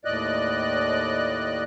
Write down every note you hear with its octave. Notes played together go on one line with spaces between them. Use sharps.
D#2 A2 D5 D#5 F#6